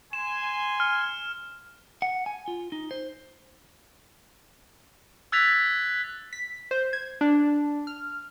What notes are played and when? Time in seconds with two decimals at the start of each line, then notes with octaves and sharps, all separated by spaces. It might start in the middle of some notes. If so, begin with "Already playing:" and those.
0.13 G#5 C6 E7
0.80 F6
2.02 F#5
2.26 G#5
2.48 F4
2.72 D#4
2.91 C5
5.32 E6 F#6 G#6 A6 B6 F7
6.33 B6
6.71 C5
6.93 G#6
7.21 D4
7.87 F6